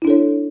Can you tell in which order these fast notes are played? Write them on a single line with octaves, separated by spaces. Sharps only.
E4 D4 A4 C#5